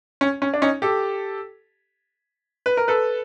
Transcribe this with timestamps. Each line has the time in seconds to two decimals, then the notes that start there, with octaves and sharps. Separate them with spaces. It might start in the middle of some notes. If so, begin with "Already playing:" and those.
0.21 C#4
0.42 C#4
0.54 D4
0.62 C#4 D#4
0.82 G4 A4
2.66 B4
2.77 A#4
2.88 A4 B4